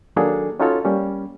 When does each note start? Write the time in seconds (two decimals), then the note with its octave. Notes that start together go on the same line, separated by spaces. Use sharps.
0.16 D#3 F#3 A#3 D4 G#4 A4
0.60 C#4 D#4 F4 F#4 A4 C#5
0.85 G3 A#3 C#4